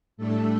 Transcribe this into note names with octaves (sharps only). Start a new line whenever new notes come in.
A2 G3 A3 D4 A4